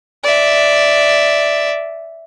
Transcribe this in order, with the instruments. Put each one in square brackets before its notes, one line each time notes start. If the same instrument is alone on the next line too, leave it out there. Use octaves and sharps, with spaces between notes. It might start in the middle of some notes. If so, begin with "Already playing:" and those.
[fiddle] D5 E5